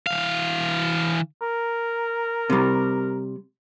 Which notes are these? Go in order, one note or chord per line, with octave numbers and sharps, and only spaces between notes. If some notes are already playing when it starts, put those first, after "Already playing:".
E3 F5
A#4
C3 G3